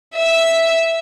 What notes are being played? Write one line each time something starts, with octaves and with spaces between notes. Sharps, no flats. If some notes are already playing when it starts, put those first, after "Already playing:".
E5 E6